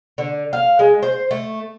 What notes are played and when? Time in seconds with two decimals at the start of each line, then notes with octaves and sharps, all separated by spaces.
0.18 D3
0.53 F5
0.79 G#3
1.03 C5
1.31 A3